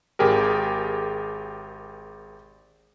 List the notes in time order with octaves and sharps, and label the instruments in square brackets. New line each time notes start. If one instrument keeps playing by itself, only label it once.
[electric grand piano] G#1 G4 G#4 A#4